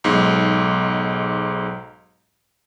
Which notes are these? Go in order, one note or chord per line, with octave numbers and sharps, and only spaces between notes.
B1 G#2